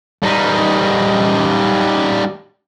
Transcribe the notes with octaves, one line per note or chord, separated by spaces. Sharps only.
G3 D#4